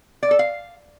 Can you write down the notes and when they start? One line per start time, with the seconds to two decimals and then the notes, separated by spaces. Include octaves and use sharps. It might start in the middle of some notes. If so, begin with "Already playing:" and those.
0.23 D5
0.31 A4
0.39 F5